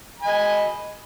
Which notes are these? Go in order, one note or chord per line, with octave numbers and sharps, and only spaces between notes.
D#5 G#5 B5